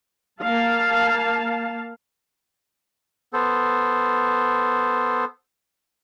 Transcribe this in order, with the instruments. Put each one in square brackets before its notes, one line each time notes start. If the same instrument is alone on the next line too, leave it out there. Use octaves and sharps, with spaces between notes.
[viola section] A#3 F5 A5
[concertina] B3 A4 C5